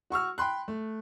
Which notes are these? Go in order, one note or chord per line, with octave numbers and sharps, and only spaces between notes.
F#4 C#6 E6 F6
G5 B5 C6 F#6
A3